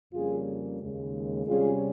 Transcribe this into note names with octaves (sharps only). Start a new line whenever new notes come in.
F2 C#3 G3 A#3 C#4 F4 G#4
D#2 C#3 G#3
C3 G3 C#4 F4 G#4